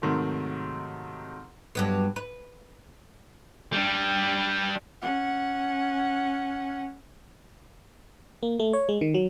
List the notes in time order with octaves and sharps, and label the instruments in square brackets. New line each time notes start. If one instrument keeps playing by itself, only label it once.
[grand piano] G#2 C3 D#3 F#3 A3
[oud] G2 F#3 B3
B4
[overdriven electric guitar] G3 D4
[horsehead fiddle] C#4 F#5
[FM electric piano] A#3
A3
C#5
G#3
D#3
F#3